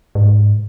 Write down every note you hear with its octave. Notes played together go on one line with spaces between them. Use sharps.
G#2